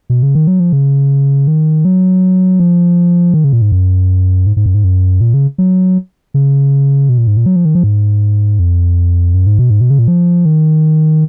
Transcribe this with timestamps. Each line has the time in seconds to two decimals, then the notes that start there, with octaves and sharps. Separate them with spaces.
0.10 B2
0.23 C#3
0.35 D#3
0.47 F#3
0.60 F3
0.73 C#3
1.48 D#3
1.85 F#3
2.60 F3
3.34 D#3
3.44 C#3
3.53 A#2
3.62 G#2
3.72 F#2
4.47 G#2
4.57 G#2
4.66 F#2
4.74 G#2
4.84 F#2
5.21 A#2
5.34 C#3
5.58 F#3
6.34 C#3
7.09 B2
7.18 A#2
7.27 G#2
7.37 A#2
7.46 F#3
7.56 F3
7.65 D#3
7.75 F3
7.83 G#2
8.59 F2
9.34 F#2
9.47 G#2
9.59 B2
9.70 G#2
9.81 B2
9.90 C#3
9.99 A#2
10.08 F3
10.45 D#3